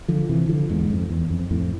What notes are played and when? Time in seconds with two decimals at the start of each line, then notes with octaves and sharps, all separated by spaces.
0.08 D3 F3
0.29 C3 E3
0.49 D3 F3
0.69 E2 G#2
0.90 F2
1.09 E2
1.30 F2
1.51 F2 A2